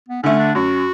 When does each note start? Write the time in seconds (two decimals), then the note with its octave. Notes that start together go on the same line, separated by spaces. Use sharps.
0.08 B3
0.23 D3 A3 C#4
0.39 D4
0.55 F#2 F#4